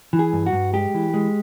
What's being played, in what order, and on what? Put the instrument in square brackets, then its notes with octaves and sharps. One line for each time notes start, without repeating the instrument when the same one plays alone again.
[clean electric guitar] E3
G#4
G2
F#4
G2
G#3 G4
E3
G#3